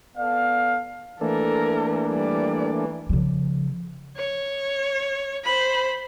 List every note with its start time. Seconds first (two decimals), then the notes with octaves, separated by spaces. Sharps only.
0.17 B3 A4 D5 F5
1.21 E3 A3 A#3 D4 A4 A#4
2.10 G3 D5
3.09 C#3 F3
4.17 C#5
5.44 C5 B5